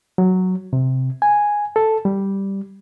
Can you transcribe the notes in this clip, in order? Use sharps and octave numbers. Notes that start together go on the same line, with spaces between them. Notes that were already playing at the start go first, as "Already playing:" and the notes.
F#3
C3
G#5
A4
G3